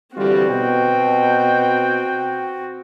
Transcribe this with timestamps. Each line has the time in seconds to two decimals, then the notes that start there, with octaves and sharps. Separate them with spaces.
0.16 D3 E3 G3 C4 F4 F#4
0.50 B2 G5